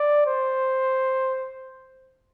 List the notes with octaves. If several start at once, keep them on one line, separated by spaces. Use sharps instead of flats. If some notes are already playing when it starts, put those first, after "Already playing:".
Already playing: D5
C5